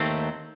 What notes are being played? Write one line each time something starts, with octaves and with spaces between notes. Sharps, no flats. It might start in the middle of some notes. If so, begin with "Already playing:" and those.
Already playing: D#2 D#3 A3 C4